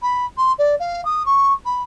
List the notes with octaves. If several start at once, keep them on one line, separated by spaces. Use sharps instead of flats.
B5
C6
D5
F5
D#6
C#6
B5